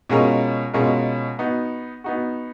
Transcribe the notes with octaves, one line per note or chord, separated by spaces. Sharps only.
B2 G#3 C#4 F4 A#4
B2 G#3 C#4 F4 A#4
B3 D#4 F#4
B3 D#4 F#4